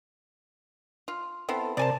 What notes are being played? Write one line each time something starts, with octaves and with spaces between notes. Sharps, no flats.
F4
B3 C4 E4 A4
C3 A#4 C5 D5 G#5 A5